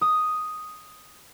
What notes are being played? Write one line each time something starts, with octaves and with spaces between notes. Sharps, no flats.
D#6